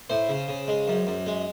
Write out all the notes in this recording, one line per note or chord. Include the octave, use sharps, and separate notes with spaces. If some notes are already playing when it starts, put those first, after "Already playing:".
A2 C5
C#3
C#3
G#3
F#2
F#2
G#3